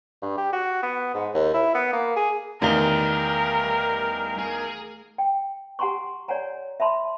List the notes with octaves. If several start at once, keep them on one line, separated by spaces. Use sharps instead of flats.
G2
G4
F#4
B3
G#2
D#2
E4
B3
A#3
G#4
E2 D#3 G3 A3 A#4 F5 A#5 G7
G#4
G5
G4 F#5 G#5 A#5 C6 C#6
C#5 D5 F#5 G#5 A#5
E5 A5 B5 C6